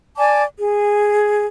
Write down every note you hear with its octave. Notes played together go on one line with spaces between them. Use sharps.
D5 G#5 A5 D6
G#4